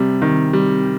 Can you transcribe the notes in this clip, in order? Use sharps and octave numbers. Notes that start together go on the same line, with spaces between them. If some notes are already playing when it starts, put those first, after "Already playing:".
Already playing: C3 G3
D#3
G3